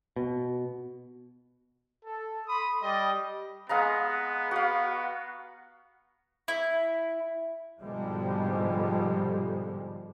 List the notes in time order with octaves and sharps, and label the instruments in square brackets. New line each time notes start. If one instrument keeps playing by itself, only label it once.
[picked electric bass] B2
[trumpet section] A4
B5 C6 D#6
G3 D5 D#5
[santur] G#3 F5 A#5 [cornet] B3
[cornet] B3 [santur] F#4 F5
[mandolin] E4
[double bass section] G#2 B2 D3 F3 G3 G#3